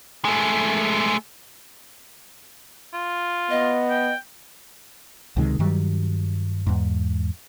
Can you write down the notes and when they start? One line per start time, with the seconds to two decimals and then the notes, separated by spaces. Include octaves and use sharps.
0.25 G#3 A3
2.93 F4
3.50 B3 D#5
3.90 G5
5.37 C#2 C3 D#3 G#3
5.59 G2 D#3 F#3 G3
6.67 E2 G#2